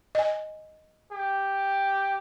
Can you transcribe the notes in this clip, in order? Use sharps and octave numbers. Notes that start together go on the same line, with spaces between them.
D#5 G#5
G4